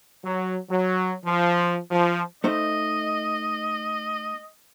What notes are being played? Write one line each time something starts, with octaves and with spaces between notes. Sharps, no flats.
F#3
F#3
F3
F3
A3 D#4 C5 D#5